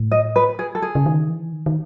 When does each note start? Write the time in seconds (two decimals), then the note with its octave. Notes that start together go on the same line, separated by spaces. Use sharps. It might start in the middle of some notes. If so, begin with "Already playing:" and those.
Already playing: A2
0.12 D#5
0.36 B4
0.59 G#4
0.75 A4
0.82 G#4
0.95 C#3
1.06 D#3
1.29 E3
1.53 D#3
1.66 D#3